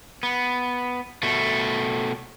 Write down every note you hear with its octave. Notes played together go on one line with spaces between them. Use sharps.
B3
B2 A3